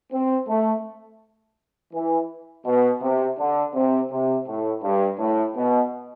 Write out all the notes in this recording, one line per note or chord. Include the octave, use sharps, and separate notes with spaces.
C4
A3
E3
B2
C3
D3
C3
C3
A2
G2
A2
B2